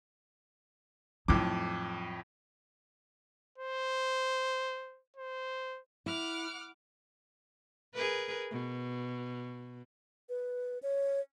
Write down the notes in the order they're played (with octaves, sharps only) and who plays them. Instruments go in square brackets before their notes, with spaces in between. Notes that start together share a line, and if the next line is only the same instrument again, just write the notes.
[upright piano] F2 A2 D6 [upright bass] F#3 D#4
[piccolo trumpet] C5
C5
[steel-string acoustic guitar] E4 [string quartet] F#5 D6 F6
[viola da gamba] G#4 A#4 B4
B2
[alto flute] B4
C#5